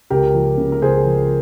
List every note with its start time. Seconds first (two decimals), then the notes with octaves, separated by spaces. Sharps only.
0.10 C#2 G4 A#4
0.35 F3
0.58 C#3
0.72 A#4
0.82 C#2 G#4 C5
1.05 F3